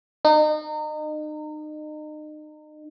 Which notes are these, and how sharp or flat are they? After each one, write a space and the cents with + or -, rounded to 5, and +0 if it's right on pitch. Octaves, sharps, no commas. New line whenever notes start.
D#4 -35